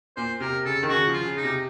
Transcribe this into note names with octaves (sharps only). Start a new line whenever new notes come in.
A#2 C5
C3 A#4
C#3 A4
D#3
C#3 F#4
F3
F4
C#3
D#4
C3